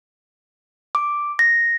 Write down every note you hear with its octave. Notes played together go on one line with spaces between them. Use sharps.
D6
A#6